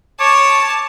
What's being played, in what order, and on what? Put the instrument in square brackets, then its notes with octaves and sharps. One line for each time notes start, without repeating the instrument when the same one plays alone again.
[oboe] C#5 [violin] A5 [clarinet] D6